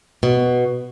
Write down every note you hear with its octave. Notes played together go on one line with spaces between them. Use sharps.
B2